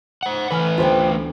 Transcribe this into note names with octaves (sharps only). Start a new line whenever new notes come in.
C5 F#5
E3 A3 B4 G#5 F6
D2 B3 F4 C5 G5